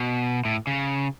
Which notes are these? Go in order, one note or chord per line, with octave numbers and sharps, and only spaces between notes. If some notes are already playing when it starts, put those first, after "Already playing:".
Already playing: B2
A2
C#3